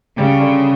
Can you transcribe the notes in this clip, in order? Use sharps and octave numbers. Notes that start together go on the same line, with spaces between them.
C#3 G3
D3